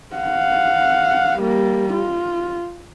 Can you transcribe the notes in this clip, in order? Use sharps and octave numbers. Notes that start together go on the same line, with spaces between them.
F5 F#5
G3 A#3
F4